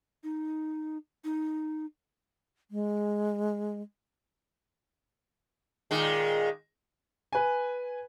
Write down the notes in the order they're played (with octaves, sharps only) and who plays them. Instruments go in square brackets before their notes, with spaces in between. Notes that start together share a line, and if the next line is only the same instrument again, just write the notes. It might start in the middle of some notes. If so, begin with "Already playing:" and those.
[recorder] D#4
D#4
[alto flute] G#3
[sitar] A#2 D#3 G#3
[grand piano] B4 G#5